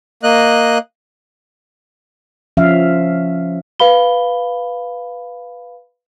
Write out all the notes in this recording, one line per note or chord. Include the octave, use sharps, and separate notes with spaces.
A#3 D#5 F#6
F3 C#4 E5 F5
B4 F5 B5 G7